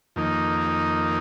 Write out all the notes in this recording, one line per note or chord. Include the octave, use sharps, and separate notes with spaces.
F2 D#3 A#3 D#4